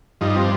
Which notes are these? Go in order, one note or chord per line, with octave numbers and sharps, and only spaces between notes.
G2 F3 D#4
C4